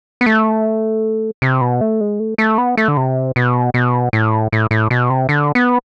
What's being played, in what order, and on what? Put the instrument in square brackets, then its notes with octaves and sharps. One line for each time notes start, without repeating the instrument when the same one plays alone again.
[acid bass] B3
A3
C3
B2
A3
G#3
A3
A3
B3
A3
D3
C3
B2
B2
A2
A2
A2
B2
C3
D3
B3